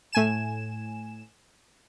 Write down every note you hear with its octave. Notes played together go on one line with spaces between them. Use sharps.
A2 G#5 E7